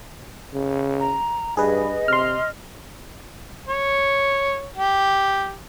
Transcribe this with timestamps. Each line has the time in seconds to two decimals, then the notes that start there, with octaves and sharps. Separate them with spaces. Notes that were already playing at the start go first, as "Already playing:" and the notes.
0.53 C#3
1.00 A#5
1.57 G2 G#4 B4 D#5
2.08 C3 C6 F6
3.68 C#5
4.77 G4